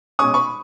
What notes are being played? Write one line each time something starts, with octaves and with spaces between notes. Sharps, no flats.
B2 G#3 C#4 C#6 D#6
B5 C#6